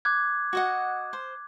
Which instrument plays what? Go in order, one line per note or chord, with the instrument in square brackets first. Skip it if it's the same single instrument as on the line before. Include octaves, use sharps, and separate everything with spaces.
[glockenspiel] D6 F#6 G#6
[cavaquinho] F#4 D#5 F#5
C5